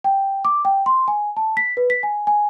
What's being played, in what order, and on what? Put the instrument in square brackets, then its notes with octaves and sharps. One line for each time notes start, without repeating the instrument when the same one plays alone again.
[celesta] G5
D6
G5
C6
G#5
A5
B6
B4
B6
G#5
G#5